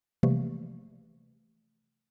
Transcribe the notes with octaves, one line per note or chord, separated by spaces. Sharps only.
C3 E3 F3 G3 A3 A#3